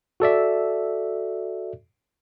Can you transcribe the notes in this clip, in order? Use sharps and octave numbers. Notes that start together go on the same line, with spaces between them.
F#4 A4 D5 E5